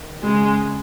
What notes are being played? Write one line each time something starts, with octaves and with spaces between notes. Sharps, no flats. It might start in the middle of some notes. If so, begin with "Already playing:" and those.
Already playing: D#3
C#3 G#3